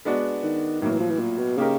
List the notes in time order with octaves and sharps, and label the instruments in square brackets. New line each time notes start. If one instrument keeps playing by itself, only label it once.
[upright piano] G#3 B3 D4 F#4
[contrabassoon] D#3
[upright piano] A2 F#3 A#3 [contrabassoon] D#3
[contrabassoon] E3
F3
E3
A#2
B2
[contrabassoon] C#3 [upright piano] A#3 D#4 G4 A#4